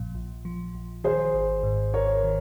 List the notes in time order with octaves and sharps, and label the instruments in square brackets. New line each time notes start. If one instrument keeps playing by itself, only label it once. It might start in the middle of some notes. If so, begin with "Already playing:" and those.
Already playing: [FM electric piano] A#1 A#2 F3
A#1
F3
A#1
[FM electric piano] D#3 [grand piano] G#4 C5
[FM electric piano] G#1
G#2
[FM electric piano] G#1 [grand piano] A#4 C#5
[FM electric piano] D#3